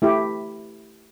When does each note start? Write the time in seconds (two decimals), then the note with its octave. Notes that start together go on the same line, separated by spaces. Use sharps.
0.02 A3 E4 G4